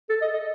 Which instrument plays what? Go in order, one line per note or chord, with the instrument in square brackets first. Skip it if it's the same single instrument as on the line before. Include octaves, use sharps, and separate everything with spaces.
[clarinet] A4
D#5
D#5